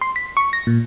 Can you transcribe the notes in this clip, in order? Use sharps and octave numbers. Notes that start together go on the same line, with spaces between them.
C6
B6
C#6
A#6
A#2